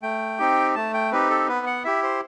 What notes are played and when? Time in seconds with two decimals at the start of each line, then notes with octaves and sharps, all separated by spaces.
0.02 A3 G5
0.39 C4 D#4 G4
0.75 A3 A5
0.94 G5
1.12 C4 D#4 G4 B4
1.30 A4
1.48 B3 B4
1.67 F#5
1.85 E4 G4 E5
2.03 C5